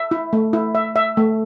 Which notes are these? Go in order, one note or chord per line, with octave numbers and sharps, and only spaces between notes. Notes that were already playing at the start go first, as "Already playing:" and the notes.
Already playing: E5
E4
A3
E4
E5
E5
A3